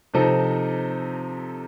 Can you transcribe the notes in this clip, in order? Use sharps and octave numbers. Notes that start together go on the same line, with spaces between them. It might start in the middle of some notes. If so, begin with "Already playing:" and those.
C3 F3 C4 D#4 A4